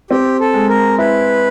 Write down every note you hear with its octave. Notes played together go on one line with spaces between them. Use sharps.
C4 G4
A4
G#3
A#4
E4 B4